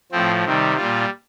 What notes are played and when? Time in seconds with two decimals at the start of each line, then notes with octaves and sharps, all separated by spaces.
0.12 A2 F3 C4
0.44 C3 D#3 G3
0.77 A#2 G3 F4